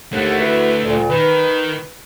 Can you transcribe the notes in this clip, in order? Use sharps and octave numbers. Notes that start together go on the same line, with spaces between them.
D#2 D3 A3 F#5
E4 F#4 B4
D2 A#2
D#3 B4